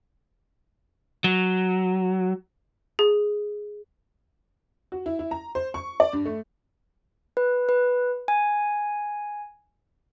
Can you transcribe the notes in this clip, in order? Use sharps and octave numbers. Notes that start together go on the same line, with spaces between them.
F#3
G#4
F#4
E4
E4
A#5
C5
C#6
D5
G2
A3
B4
B4
G#5